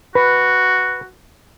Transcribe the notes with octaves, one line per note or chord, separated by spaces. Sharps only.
F#4 B4